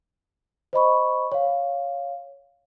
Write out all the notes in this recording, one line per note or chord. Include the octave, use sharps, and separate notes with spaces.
C5 D#5 B5 C#6
C#5 F5